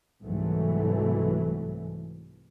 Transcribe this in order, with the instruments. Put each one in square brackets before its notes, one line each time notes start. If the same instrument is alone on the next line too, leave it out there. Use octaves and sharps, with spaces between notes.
[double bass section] C2 G#2 E3 F#3 A3